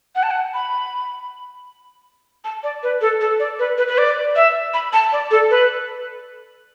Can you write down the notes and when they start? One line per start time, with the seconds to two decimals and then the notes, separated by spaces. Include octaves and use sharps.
0.15 F#5
0.23 A5
0.31 F#5
0.54 B5
2.44 A5
2.63 D5
2.83 B4
3.01 A4
3.21 A4
3.39 D5
3.59 B4
3.78 B4
3.88 B4
3.98 D5
4.36 E5
4.74 B5
4.93 A5
5.12 D5
5.31 A4
5.50 B4